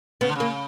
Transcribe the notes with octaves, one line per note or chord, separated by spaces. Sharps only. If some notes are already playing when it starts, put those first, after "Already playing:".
C#3 B3
D3
C#3 A#3